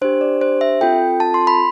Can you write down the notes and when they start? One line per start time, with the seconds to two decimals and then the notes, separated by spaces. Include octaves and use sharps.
0.01 D4 G4 C5
0.21 D5
0.41 C5
0.61 E5
0.81 C4 F4 A4 G5
1.20 A5
1.34 C6
1.47 B5